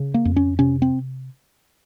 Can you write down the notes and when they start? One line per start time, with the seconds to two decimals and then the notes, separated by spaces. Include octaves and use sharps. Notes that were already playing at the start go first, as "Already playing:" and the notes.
Already playing: C#3
0.14 A#3
0.25 F2
0.36 C#4
0.59 C3 C#4
0.82 C4